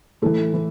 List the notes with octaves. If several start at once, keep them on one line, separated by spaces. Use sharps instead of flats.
A2 E3 A4
A2 E3